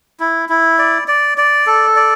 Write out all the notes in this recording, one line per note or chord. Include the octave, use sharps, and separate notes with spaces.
E4
E4
D5
D5
D5
A4
D5